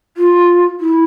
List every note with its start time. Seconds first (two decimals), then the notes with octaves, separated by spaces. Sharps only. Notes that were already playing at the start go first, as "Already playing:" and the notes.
0.17 F4
0.80 E4